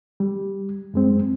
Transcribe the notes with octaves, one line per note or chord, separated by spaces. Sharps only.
G3
F#2 G#3 C4